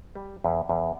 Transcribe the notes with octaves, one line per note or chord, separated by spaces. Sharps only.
G3
E2
E2